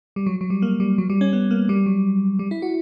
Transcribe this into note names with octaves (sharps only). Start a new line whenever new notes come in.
G3
F#3
F#3
G3
A#3
G3
F#3
G3
C#4
B3
A#3
G3
F#3
G3
E4
F#4